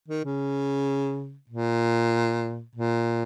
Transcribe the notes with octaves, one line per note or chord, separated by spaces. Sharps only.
D#3
C#3
A#2
A#2